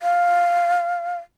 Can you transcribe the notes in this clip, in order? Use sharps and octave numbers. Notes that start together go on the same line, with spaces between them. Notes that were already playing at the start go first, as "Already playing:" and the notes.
F5